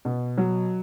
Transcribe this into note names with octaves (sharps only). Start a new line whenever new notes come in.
B2
F#3